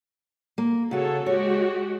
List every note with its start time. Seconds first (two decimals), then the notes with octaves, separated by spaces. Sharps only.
0.58 A#3
0.91 C#3 F#4 G#4 A4 C#5
1.26 G#3 F#4 G4 C#5